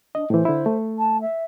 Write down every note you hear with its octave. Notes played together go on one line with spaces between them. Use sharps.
D4 D#5
A2 E3 C5
D3 E4
A3
A5
E5